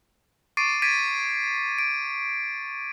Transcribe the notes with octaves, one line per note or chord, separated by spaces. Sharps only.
C#6 D6 A6 C7 D7 D#7
G#6 A6 B6 D7 D#7
D7